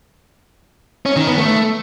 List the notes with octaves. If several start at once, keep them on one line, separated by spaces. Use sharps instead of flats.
C#4
D#3
B3
A3